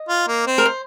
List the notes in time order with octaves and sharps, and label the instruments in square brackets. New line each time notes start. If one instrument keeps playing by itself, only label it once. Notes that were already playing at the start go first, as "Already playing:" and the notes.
Already playing: [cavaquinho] D#5
[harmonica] F4
A#3
C4
[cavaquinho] A#4
C5